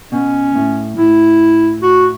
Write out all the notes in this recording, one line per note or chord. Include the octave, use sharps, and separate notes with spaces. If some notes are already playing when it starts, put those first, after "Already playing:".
B2 C#4
A2
A2 E4
F#4